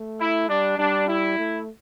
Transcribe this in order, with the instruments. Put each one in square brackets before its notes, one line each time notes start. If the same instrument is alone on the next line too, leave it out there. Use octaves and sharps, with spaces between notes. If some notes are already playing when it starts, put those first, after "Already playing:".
Already playing: [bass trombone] A3
[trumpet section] E4
[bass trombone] G3 [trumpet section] D4
[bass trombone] G3 [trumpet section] D4
[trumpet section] E4
[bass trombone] A3